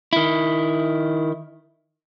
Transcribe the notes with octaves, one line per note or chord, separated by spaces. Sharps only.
D#3 E4